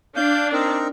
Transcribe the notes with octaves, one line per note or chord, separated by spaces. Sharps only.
D4 F5 G6
C4 D#4 A#4